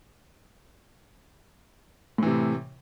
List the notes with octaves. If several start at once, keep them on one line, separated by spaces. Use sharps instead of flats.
A2 C3 E3